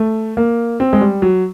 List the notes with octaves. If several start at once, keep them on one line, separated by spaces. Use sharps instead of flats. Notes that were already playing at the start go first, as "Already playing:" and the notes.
Already playing: A3
A#3
C4
G#3
G3
F#3